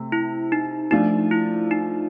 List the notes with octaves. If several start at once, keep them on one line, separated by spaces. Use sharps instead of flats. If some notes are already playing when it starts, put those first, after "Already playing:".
Already playing: C3 A3
E4
D#4
F3 A3 D4 D#4 F4
E4
D#4